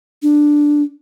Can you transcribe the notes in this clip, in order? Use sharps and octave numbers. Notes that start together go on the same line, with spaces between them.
D4